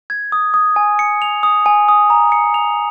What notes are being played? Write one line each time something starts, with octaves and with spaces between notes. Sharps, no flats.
G#6
D#6
D#6
G#5
C#7
F7
D#6
G#5
D#6
A#5
C#7
F7